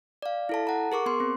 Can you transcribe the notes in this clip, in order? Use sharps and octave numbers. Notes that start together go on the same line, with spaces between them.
D5 F5
E4 A4 A5
F#5 A#5
G#4 A#4 C#6 D6
B3 C6
C4